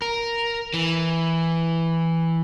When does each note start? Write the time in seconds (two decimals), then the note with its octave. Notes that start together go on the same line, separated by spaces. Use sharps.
0.02 A#4
0.74 E3